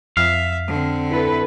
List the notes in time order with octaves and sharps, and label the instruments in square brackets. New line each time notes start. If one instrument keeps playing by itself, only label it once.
[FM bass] F2 [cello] E5 [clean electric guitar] F5
[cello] D3 C4
[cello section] E4 A4 B4